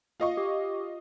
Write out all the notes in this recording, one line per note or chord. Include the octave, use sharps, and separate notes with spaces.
F4 D#5 C#6
G4